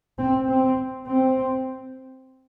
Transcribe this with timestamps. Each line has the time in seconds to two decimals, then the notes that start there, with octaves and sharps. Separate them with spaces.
0.18 C4
0.47 C4
1.05 C4